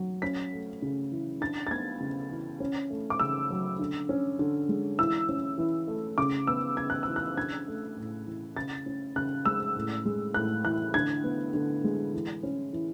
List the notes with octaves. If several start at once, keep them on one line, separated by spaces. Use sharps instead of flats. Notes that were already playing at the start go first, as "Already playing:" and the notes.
Already playing: F#3
C#4 B6
A3
C#3
E3
D4 A6
A6
B3 G#6
C#3
E3
C#4
A3
D6
C#3 E6
F#3
D3
C#4
D3
G#3
E3 E6
C#4
E3
A3
C#3 D6
B3 E6
C#3 G#6
F#6
E3 E6
F#6
D4 G#6
A3
A2
E3
C#3 A6
C#4
C#3 F#6
G#3 E6
A2
G#3
A2 F#6
E3 F#6
D3 G#6
B3
D3
G#3
E3
C#4
E3